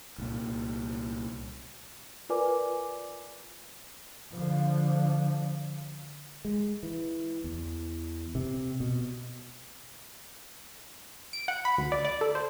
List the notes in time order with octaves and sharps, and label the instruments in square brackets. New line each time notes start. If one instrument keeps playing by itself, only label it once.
[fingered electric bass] C2 A#2
[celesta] F4 A#4 B4 D5 G#5 D6
[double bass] D3 F3
[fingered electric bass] G#3
E3
E2
C3
B2
[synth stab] D7
F#5
B5
D2
D5
D5
A4
C5